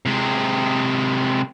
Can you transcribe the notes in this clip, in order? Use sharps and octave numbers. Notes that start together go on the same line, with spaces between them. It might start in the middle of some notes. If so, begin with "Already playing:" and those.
C3 G#3